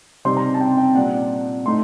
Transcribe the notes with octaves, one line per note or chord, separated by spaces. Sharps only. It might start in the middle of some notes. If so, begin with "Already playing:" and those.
C3 G3 C4 D#4 C6
A#5
A5
G5
G5
A#2 G3 D4 F#5
A2 A3 D#4 C6